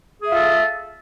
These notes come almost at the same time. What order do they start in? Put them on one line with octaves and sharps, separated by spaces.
G#4 E5 F4 A4